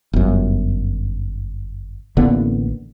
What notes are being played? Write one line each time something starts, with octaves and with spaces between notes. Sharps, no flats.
G1 F#2
A1 D3 A#3 B3